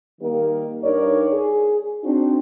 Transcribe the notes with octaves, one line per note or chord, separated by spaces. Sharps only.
D#3 G3 A#3 D#4 A#4
G2 D#4 A#4 C#5 D5
G#4
C4 D4 D#4 F#4 C5